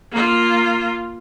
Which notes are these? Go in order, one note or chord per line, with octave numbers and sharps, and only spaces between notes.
A#3 F4